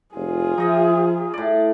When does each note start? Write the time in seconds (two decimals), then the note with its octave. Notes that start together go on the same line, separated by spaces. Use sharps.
0.15 F1 F4 G#4
0.58 F3 D#4 D#5 E5
1.34 A2 D5